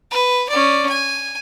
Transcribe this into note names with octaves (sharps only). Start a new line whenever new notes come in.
B4
C#4 D5
G#5